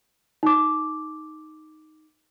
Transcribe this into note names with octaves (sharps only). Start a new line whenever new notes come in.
D#4 D6